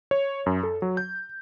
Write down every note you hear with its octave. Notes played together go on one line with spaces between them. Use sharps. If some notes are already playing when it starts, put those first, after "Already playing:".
C#5
F#2
A4
F#3
G6